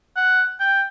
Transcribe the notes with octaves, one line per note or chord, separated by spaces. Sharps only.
F#5
G5